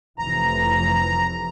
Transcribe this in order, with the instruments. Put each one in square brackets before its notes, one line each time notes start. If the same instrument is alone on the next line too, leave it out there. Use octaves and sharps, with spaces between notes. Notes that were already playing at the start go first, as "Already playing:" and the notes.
[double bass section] F1 E3 [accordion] A#5